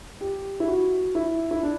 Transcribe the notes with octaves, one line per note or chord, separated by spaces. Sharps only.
G4
E4
F#4
E4
E4
D4